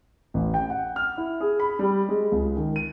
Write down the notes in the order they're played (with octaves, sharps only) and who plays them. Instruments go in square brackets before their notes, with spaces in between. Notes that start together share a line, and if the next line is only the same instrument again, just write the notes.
[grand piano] A1
G5
F#5
F6
E4
G#4
B5
G3
G#3
C#2
D#3
D#7